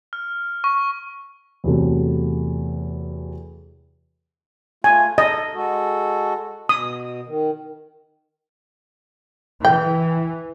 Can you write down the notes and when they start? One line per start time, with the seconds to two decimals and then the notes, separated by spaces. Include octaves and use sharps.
0.13 F6
0.64 C#6
1.64 E2 C3 F#3 A3
4.84 A3 F4 G#5
5.18 A4 D#5
5.53 G#3 F#4 A4
6.69 B2 D#6
7.27 D#3
9.65 E3 G5